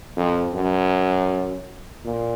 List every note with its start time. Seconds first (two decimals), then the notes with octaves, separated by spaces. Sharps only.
0.16 F2
0.54 F#2
2.05 A#2